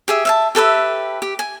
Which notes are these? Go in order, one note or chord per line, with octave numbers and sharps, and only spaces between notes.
G4 G#4 E5
E5 F5 A5
G4 A4 B4 E5
G4
G#5